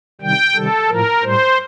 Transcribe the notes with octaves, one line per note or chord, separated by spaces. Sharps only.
C3 D#3 G3 G5
C3 D#3 G3 A4
A2 F3 A#4
A2 G3 C5